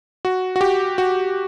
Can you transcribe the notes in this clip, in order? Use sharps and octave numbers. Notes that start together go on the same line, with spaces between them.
F#4
F#4
G4
F#4